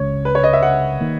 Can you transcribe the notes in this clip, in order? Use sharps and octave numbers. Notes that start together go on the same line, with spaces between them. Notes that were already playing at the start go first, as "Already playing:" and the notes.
Already playing: C#2 C#3 G#3 C#5
B4
C#5
D#5
E5
F#5
D#3 A#3